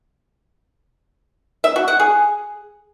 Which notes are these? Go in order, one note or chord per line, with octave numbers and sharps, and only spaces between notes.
E5
F#4
F#5
G#4